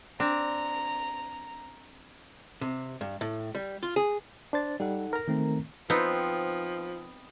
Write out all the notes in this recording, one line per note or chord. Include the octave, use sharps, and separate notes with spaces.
C4 D4 A#5
C3
G2
A2
G3
F4
G#4
D4 C5 A6
G3 D#4 A4 F#5
A#4 A#5
D#3 A3 C4
F3 B3 C4 D#4